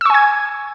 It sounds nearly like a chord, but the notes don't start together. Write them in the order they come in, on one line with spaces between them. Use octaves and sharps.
E6 C#6 G#5 G#6